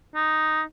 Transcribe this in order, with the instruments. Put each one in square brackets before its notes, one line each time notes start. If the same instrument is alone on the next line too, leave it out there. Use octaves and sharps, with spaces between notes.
[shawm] D#4